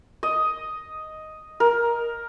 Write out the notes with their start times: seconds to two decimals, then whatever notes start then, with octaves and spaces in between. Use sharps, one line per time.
0.23 D#5
1.60 A#4